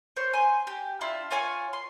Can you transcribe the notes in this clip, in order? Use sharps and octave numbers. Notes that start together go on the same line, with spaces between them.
C5 C#5
G#5 C6
G4
D4 E4 F4
F4 C#5 G#5 C#6
C6